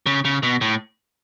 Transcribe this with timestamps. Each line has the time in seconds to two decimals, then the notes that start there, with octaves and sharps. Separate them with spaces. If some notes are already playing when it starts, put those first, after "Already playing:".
0.06 C#3
0.25 C#3
0.43 B2
0.61 A2